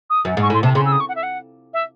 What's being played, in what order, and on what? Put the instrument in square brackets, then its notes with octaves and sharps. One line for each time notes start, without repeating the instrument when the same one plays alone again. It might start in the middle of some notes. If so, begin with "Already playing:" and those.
[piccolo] D#6
[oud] F#2
G#2
[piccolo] C#6
[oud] A2 [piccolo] C6
[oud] C3 [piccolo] A5
[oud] C#3 [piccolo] C6
[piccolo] E6
D#6
C#6
F#5
E5
F#5
E5